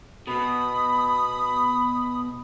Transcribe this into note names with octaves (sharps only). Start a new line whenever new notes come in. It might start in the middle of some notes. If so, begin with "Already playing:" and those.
B2 B5 D#6